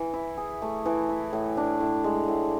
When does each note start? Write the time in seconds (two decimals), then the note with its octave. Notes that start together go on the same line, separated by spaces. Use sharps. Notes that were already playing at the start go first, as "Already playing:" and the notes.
Already playing: E3
0.13 E4
0.37 G#4
0.62 A3
0.86 E3
1.09 E4
1.33 A2
1.57 D4
1.80 A2
2.04 G#3
2.28 A2